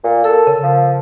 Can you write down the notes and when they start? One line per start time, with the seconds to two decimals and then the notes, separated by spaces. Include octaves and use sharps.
0.04 A#2
0.24 A4 A#4
0.47 C#3
0.63 F3